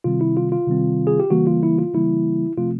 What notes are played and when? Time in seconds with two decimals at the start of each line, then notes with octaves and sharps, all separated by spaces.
0.04 C3 D#3 G3 C4 F4
0.21 E4
0.37 F4
0.52 F4
0.67 C3 D#3 G3 C4
1.07 G#4
1.20 G4
1.30 C#3 E3 G3 A#3 F#4
1.47 F4
1.63 E4
1.78 F4
1.94 C#3 E3 G3 A#3 E4
2.58 C3 F3 A3 C4 F4